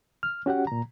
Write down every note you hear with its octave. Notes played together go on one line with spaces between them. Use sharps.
F6
C#4 F#4 G4 F#5
A#2 A#5